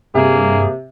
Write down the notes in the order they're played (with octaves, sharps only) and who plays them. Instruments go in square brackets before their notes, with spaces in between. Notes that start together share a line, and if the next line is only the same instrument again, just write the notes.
[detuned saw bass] G2 [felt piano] C3 [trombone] A#3 [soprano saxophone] G#4